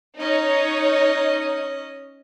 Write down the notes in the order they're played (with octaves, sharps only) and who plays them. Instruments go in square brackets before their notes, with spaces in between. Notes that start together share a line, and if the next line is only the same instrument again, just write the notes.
[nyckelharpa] C#4 D#5 [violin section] D#4 C#5